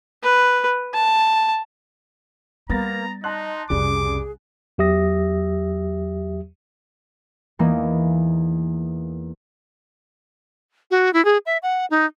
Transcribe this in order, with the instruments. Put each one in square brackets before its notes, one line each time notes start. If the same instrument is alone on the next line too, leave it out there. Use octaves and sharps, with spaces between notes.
[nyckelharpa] B4
A5
[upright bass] G3 [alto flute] A#3 [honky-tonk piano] B3 A6 A#6 [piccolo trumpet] A#5
[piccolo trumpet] D#4 [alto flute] D#5 [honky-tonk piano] A5 C6 F#6
[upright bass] C2 F2 [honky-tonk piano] C#3 G3 [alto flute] G#4 [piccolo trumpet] D6
[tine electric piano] E2 F#3 G4 E5 D#6 A#6
[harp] E2 E3 A#3 D#4
[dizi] F#4
E4
G#4
E5
F#5
D#4